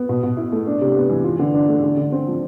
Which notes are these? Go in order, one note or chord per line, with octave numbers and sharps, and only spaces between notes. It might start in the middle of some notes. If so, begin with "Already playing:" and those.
Already playing: B3
B2
B2
E4
A3
D4
C3
B3
E3
F4
D3
D4
A3
D3
D3
C4
F3